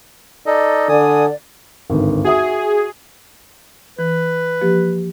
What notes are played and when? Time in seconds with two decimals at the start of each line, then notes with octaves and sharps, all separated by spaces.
0.46 D#4 A4 D5 D#5
0.89 D3 G#5 D#6
1.90 G#1 D2 G2
2.24 F#4 G#4 E5 D#6
3.99 E3 B4
4.61 F3 A#3 G4